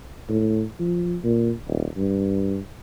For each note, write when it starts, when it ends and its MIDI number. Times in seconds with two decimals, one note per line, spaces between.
0.29 0.62 45
0.79 1.16 53
1.24 1.51 46
1.68 1.87 27
1.97 2.59 43